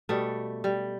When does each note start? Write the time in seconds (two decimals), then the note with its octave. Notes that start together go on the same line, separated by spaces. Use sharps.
0.09 B2 G3 A3
0.64 G3